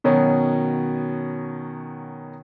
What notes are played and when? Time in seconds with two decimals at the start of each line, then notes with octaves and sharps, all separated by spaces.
0.04 B2 D#3 F#3 C#4